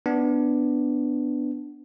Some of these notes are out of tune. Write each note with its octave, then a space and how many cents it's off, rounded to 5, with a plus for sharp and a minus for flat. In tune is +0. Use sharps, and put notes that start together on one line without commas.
B3 +5 D4 +0